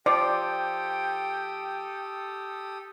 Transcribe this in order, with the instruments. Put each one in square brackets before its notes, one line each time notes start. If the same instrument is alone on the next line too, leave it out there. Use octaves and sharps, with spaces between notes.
[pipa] F3 [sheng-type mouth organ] G4 A4 D#6 [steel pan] D5 [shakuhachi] G5